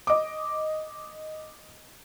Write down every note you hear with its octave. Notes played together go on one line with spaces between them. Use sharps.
D#5 D6